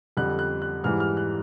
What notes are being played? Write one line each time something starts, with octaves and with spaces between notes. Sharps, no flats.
F2 D3 G3 F#6
F#6
F#6
G#2 E3 G3 F6
F6
F#6